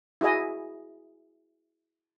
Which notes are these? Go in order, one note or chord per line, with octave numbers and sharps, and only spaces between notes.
E4 F#4 G#4 D#5 G#5